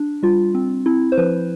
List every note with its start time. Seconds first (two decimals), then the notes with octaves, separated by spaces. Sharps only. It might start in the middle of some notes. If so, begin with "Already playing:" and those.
Already playing: D4
0.23 G3 F4
0.55 C4
0.86 C4 E4
1.12 C5
1.17 F3 B4